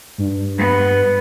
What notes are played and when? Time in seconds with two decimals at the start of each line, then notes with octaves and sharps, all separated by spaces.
0.18 G2
0.58 B3